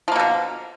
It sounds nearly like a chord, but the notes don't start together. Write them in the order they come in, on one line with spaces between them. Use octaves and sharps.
F3 A#3 B2 D3